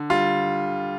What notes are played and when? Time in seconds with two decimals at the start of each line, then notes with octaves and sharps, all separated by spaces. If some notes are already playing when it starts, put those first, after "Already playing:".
Already playing: D3
0.10 G3 F4